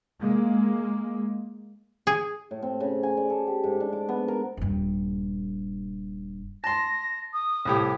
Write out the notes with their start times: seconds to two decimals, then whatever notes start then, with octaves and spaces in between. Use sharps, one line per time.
0.20 G#3 A#3
2.07 G#4
2.51 A2
2.62 C4
2.80 C#3
3.03 G#5
3.17 D5
3.30 A4
3.47 G4
3.64 G#2
3.80 D4
3.93 D6
4.09 B3
4.28 A#4
4.57 D#1 G2
6.64 A5 C6 A#6
7.33 D#6
7.65 C2 A2 G4